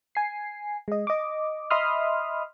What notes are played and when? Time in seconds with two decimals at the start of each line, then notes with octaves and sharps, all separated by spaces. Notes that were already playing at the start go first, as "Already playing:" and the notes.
0.15 G#5 C7
0.88 G#3 D#5
1.07 D#5 D6
1.70 D#5 E5 B5 C6 D#6 F6